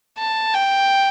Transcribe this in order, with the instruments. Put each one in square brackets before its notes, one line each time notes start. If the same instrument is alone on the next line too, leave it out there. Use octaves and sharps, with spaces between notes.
[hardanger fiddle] A5
G5